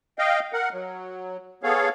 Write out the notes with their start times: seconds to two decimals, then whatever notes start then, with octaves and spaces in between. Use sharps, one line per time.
0.19 D#5 F5 G5
0.53 A#4 F#5
0.73 F#3
1.63 B3 G#4 A4 C#5 F5